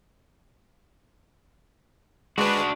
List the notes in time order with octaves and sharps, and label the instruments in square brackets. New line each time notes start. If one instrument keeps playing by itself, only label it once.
[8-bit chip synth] G#3 B4 [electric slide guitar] D4 F#4